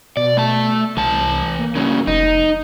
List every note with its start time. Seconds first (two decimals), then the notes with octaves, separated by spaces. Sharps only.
0.17 B2 D5
0.37 A3 A5
0.97 C2 E3 A5
1.58 A#3
1.75 G2 C#3
2.07 F1 D#4